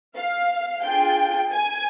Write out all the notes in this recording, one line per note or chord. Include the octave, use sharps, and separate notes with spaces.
F5
D4 F4 G#4 G5
G#5